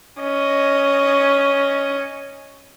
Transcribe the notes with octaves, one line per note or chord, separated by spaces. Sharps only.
C#4 D#5